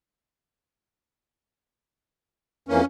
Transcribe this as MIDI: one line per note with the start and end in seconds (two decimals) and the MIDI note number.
2.69 2.81 41
2.69 2.81 52
2.69 2.81 58
2.69 2.85 61